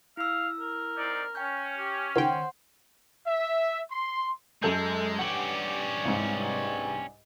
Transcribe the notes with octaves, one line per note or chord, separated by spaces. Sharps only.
E4 F5 E6
A#4
C4 D#4 D5
C#4 G5 F6 G6
G4
C#2 D#3 C5 F#5 G5 C6
E5
C6
F#2 G#3 A4 G6
G2 C#4 G4 D5 F#5 G#5 F#7
C2 G#2